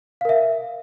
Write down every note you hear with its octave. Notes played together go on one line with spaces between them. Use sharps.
A#4 E5 F5